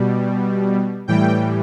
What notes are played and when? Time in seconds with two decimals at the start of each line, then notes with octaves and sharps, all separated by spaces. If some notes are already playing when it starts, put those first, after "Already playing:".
Already playing: B2 G3
1.08 A2 E3 G3 G5